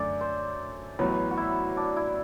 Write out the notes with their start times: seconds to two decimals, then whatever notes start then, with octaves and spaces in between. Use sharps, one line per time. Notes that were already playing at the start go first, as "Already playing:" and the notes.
Already playing: F#2 D3 A3 D5 E5
0.21 C5
0.99 A1 A2 F#3 B3 B4
1.31 F#4
1.37 E4
1.77 D4
1.96 E4